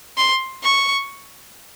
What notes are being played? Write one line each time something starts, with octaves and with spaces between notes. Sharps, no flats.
C6
C#6